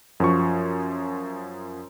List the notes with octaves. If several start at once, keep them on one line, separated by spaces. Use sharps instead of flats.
F#2 F3 C#6